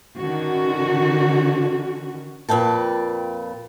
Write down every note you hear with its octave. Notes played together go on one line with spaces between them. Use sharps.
D3 D#3 C#4 F#4
F2 A#2 B4 G5 A5